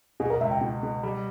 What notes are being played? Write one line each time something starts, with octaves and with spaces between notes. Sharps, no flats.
B2 G#4
A#4
C#2 E5
G5
B2
B2
G3